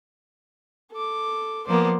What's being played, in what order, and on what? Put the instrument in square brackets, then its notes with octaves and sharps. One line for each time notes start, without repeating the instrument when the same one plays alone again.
[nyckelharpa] A4 D6
[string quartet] F3 A#3 B3 [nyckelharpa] C5 D5